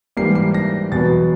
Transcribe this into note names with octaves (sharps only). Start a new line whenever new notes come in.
G#2 E3 G3 A#3 C7
C7
A#6
E2 B2 F#3 B3 A6